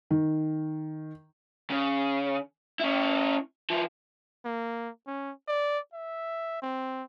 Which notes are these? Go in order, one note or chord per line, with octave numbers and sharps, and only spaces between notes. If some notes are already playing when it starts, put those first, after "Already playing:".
D#3
C#3
C#4 E4
F3 E4
A#3
C#4
D5
E5
C4